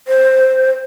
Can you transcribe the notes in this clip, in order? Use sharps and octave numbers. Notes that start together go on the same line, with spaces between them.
C5